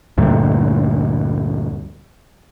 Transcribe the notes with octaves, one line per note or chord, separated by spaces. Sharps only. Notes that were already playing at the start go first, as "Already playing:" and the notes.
D2 G2 A#2